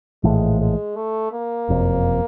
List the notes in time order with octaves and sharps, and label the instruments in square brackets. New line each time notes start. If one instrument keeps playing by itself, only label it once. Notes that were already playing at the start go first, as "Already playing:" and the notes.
[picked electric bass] A#1 A2 E3 A3 [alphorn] G#3
[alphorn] G#3
A3
A#3
[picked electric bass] F#1 F2 C3